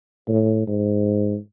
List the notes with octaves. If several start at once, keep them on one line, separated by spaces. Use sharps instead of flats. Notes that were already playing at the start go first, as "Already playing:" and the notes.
A2
G#2